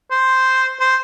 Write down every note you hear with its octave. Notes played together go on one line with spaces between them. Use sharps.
C5
C5